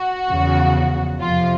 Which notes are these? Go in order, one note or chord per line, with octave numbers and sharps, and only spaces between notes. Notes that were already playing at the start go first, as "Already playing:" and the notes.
Already playing: F#4
E2 C#3 F3
F2 C3 F3 F4